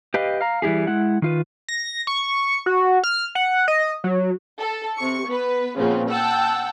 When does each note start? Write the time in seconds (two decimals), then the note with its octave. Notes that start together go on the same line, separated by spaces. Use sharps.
0.14 G4 B4 D#5 F5 G5
0.41 F5 A#5
0.62 E3 G3 E4 G4 G#4
0.87 G#3 E4 F#5
1.22 D#3 F4 B4
1.68 A#6
2.07 C#6
2.66 F#4
3.04 F6
3.35 F#5
3.68 D#5
4.04 F#3
4.60 A4
4.96 C3 C#6 C#7
5.28 B3 B4
5.78 A#2 C#3 F3 B3 C4
6.09 F#5 G5 A5 E6